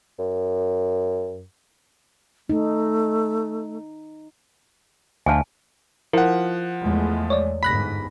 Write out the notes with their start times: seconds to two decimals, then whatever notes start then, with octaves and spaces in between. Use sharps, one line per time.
0.19 F#2
2.49 A3 D#4
5.26 D2 F5 G#5 A5
6.13 F3 E4 F4 A#4 F#5
6.84 E2 G#3 A3
7.30 C#5 D5
7.63 G1 G#2 B5 F#6 A#6 B6